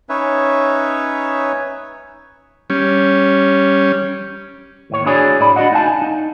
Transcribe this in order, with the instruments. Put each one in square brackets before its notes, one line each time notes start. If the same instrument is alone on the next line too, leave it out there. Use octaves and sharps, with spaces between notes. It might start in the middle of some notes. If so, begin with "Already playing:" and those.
[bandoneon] C#4 D#4 B4 C#5 E5
[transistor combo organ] G3 C#4
[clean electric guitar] D#2 A2 C#5
D4 E4 F#4 G#4 C#5 D5
A2 D5 B5
D4 F#4 D5 D#5 F#5
D#4 F5 G#5 A5
D#4